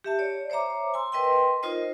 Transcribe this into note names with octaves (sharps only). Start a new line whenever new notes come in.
G4 E5 A5
C#5 D5
C5 C#5 E5 A#5 D6
G#5 C6 E6
A#4 B4 D#5 G5 C6
D#4 F4 A#4 C5 D#5